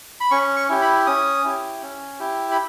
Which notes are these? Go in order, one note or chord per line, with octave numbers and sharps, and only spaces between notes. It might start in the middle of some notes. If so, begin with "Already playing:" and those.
B5
C#4 C#6
C#6
E4 G4
B5
C#4 D#6
E4 G4
C#4
E4 G4
B5